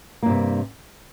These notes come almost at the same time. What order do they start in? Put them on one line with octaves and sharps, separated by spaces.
A#3 G2 C3